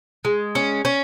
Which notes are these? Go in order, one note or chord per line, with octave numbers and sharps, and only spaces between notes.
G#3
C#4
C#4